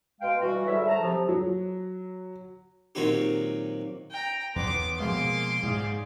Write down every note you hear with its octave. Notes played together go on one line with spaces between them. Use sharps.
B2 G#3 F5 G5
E3 G3 F#4
G#2 D3 G3 C#5 E5
A3 A5 A#5
C3 F3 F#3
F#3
A#2 D#3 F#3 C4 D#4 G4
G5 A#5
E2 B3 C6 D6
B2 F3 G#3 A#3 G#4 F5 C6 D6
G#2 G#4 D5 F5